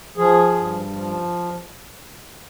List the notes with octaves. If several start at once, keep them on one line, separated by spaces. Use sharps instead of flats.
F3 G#4
G2
F3